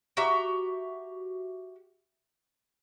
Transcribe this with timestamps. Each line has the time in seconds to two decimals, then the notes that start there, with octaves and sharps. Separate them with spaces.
0.17 F#4 G4 E5 A#5